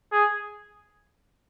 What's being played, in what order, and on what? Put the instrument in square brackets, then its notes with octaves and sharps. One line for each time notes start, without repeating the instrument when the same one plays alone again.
[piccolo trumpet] G#4